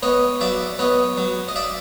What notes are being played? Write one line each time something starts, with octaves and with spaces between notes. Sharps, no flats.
B3 C#5 D#5
F#3 D5 E5
B3 C#5 D#5
F#3
D#5
D5 E5